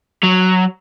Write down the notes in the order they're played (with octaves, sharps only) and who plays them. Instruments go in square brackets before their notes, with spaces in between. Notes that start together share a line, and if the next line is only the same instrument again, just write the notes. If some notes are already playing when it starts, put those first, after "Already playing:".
[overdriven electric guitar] F#3